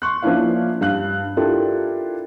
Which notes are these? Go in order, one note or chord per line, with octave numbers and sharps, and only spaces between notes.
C6 C#6 F#6
F3 A#3 C#4 D4 E4 F5
G2 F5 F#6
D4 E4 F4 G4 A4 A#4